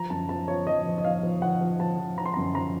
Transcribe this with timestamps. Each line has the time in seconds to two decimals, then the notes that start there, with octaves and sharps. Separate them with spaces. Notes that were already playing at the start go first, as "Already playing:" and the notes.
Already playing: F3 A#5
0.10 F#2 A5
0.29 F3 A5
0.48 F3 C#5
0.67 F3 D#5
0.86 F3
0.98 D#5
1.04 F3 F5
1.23 F3
1.42 F3 F#5
1.61 F3
1.79 F3 A5
1.98 F3
2.17 F3 A#5
2.26 C6
2.34 F#2 A#5
2.55 F3 A#5